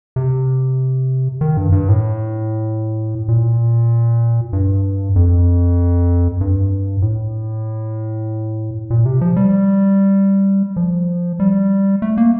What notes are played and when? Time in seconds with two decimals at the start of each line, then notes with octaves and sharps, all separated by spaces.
0.16 C3
1.41 D#3
1.57 G2
1.72 G2
1.89 A2
3.28 A#2
4.53 G2
5.16 F2
6.41 G2
7.02 A2
8.90 A#2
9.06 C3
9.21 F3
9.36 G3
10.76 F3
11.40 G3
12.02 A3
12.17 A#3